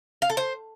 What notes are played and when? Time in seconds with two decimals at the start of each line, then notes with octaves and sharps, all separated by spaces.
0.22 F5
0.30 A4
0.37 C5